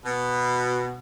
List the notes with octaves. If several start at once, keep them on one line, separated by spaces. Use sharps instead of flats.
B2